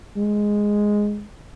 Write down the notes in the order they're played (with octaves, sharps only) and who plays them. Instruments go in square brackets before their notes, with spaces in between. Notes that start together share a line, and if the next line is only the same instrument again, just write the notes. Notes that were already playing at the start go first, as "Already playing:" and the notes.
[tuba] G#3